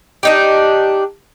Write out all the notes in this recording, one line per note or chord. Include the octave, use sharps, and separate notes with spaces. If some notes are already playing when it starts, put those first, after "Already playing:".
D4 D#4 G4